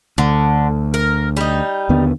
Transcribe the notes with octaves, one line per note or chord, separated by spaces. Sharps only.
D2 D3
A#4
G3 D#4
D#2 D3 B3